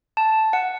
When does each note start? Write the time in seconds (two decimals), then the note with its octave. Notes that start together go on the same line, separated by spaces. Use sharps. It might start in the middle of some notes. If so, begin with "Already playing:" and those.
0.17 A5
0.53 F#5